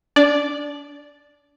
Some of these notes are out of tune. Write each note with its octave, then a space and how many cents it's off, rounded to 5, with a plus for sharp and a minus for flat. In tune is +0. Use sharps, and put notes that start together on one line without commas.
D4 -25 D5 +0